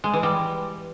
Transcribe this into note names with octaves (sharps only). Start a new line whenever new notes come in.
G#3
E3
G3